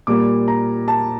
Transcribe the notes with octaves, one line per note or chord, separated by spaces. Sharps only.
A#2 G3 A#3 D6
A#5
A5